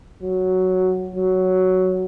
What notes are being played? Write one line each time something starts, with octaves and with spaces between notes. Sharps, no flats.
F#3
F#3